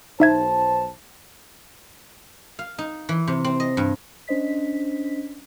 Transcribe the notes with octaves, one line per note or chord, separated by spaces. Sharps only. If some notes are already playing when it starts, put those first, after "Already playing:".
B1 D#4 C5 E5 A5 G#6
F5
D#4
E3
C3
C4
D#5
G2
C#4 D4 C5 D#5 B6